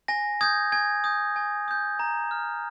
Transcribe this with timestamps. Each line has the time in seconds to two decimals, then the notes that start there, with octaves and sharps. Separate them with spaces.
0.08 G#5 A#6
0.41 D#6 G6 G#6
0.72 G#5 G#6
1.04 D#6 G6
1.36 G#5
1.68 D#6 G6
1.99 A#5
2.31 F6